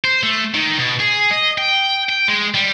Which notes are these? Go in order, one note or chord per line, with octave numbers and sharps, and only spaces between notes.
C5
A3
D#3
B2
G#4
D#5
G5
G5
G#3
G3